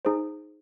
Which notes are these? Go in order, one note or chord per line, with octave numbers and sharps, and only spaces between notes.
D#4 G#4 C5